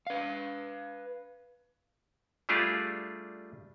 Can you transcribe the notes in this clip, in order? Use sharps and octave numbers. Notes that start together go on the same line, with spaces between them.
B4 F5
G3 A3 D4 F4 G4 G#4